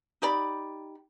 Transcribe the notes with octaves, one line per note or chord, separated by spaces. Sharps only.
D#4 G4 D5 B5